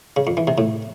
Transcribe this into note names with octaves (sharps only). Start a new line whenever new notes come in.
C#3
F2
E3
C3
A2